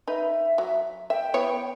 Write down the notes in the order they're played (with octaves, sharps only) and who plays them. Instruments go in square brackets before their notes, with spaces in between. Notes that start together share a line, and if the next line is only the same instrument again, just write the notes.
[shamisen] D#4 B4 [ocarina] E5
[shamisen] F#3
[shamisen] E5 [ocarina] G5
[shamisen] B3 E4 C#5